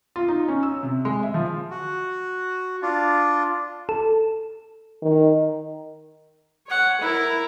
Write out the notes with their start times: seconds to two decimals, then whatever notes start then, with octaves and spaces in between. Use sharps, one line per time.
0.16 F4
0.28 D#4
0.48 C#4
0.63 E6
0.83 C3
1.05 G#3
1.23 E5
1.34 F3
1.70 F#4
2.82 D4 F4
3.89 A4
5.02 D#3
6.67 C#5 F#5
7.01 E4 A#4